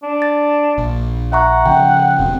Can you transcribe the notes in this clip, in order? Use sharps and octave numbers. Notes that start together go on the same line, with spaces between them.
D4
A6
A#1
E5 F#5 A#5 C#6
C#3 F3 G5
E1 B2 C4